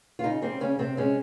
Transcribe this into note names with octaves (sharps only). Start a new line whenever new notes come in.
F4
C#3 D#4
G3 C4
C#3 C#4
C3 C4
G#3 C#4